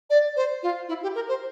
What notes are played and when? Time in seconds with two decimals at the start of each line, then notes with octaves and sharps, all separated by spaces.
0.10 D5
0.36 C5
0.62 F4
0.88 E4
1.02 G4
1.15 A#4
1.28 C5